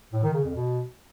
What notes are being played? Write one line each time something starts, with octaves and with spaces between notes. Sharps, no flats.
A2
D#3
C#3
F2
B2